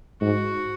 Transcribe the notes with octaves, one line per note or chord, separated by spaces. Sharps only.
G#2 F#4